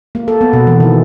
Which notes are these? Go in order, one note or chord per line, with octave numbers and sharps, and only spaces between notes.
A#3
A4
B3
B2
E3
D#3